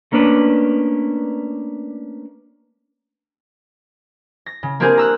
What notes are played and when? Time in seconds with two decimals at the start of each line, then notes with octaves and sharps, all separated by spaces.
0.12 A3 A#3 C#4 D4 B4
4.46 A#6
4.63 C#3
4.80 A#3 C4 D4 G4 G#4 A#4
4.98 A#5 E6 F#6